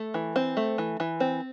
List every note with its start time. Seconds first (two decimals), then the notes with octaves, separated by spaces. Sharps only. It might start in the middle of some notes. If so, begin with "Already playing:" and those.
Already playing: A3
0.14 E3
0.36 C4
0.57 A3
0.78 E3
1.00 E3
1.20 C4